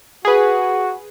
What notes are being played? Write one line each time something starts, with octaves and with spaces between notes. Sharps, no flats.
F#4 G#4 B4